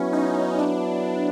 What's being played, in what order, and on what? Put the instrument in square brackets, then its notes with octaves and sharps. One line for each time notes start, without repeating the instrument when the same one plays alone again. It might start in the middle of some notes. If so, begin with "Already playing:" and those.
Already playing: [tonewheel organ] F#3 B3 E4 [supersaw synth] C#4
[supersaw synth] D#4
D4